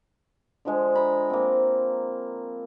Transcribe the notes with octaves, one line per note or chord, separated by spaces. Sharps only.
D3 F3 G#3
A#5 B5
A#3 C4